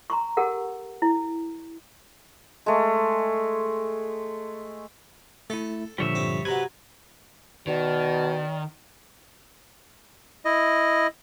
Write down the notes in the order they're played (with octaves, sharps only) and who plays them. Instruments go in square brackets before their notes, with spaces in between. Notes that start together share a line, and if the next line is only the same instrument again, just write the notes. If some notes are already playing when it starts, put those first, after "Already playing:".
[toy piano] A#5 C6 C#6
G4 A4 A#4 F#5
E4
[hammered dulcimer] G#3 A3
[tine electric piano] A3 E4 [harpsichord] A4 A5
[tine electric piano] A#2 D3 F3 [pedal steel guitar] G3 C#5 E5
[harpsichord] G2 C4
[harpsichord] C3 F#3 [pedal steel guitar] B4 [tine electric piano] A#5 G#6
[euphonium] B2 [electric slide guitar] D#3 [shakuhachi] D5
[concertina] E4 D#5